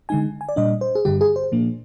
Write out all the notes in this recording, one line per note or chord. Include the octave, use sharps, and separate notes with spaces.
D3 G#3 D#4 G#5
G#5
D5
A#2 G3 D4 D#5
C5
G#4
G2 D3 G3 G4
G#4
C5
A#2 F3 A#3 D4